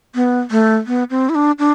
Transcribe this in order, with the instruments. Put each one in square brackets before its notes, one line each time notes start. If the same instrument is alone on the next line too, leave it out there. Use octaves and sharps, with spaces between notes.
[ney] B3
A3
B3
C4
E4
D4
D4